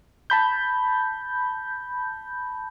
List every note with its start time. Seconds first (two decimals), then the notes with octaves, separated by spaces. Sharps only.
0.30 A5 B5 G6